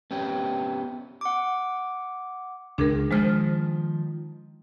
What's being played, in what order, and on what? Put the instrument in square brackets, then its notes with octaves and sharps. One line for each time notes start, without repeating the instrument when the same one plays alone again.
[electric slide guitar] B3 C#4 G4
[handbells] F#5 D6
[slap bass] C#2 [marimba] D4 G#4 A#4
[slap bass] D#3 F3 [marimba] G#3 C5 F6